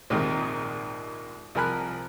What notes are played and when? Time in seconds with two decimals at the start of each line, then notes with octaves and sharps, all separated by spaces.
0.10 A#1 D#2 G#2 C3 D#3 A#4
1.55 C2 F3 A#4 G#5 B5 F#6